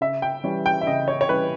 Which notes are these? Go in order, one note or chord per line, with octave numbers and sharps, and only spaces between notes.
C#3 E5
G5
E3 G3 C#4
G5
E5
C#3 D#5
C#5
C#5
E3 G3 C#4 B4